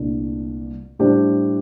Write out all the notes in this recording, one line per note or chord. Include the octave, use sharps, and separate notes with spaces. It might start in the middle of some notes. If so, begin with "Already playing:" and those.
Already playing: C2 A#2 A3 D4
A2 G3 D4 G4 C5